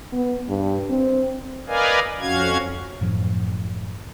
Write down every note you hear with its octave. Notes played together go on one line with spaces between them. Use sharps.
B3
G2
C4
A#4 B4 D5 D#5 F5 G#5
F2 C#4 F#4 F5 G#6
F#2 A2 F3